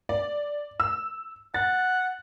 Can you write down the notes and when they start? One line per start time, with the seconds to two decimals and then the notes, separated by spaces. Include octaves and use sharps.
0.09 D5
0.80 E6
1.54 F#5 A6